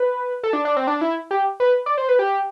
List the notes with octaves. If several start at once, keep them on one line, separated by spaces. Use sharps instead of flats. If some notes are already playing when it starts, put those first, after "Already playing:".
Already playing: B4
A4
D4
D4
C4
D4
E4
G4
B4
D5
C5
B4
G4